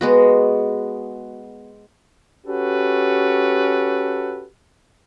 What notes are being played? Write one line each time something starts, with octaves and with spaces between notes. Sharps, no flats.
G#3 B3 F#4
C#4 F#4 G4 A4 B4